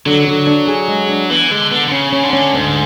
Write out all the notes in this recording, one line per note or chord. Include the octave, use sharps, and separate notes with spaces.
D3 F#3
D3
D4
G#4
G#3
D4
E3 B3
D3 G#3
D3 B3
D3
C#3 C#4
C#4
D3
C#4
D2 G#2